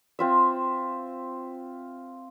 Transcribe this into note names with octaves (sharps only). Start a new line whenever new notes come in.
C4 F4 E5